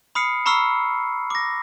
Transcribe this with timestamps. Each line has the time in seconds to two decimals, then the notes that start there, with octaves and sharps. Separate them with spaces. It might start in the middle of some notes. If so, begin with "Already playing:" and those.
0.15 B5 D#6 F6 C7 C#7
0.46 A#5 B5 C#6 E6 F6 C7
1.30 D6 A#6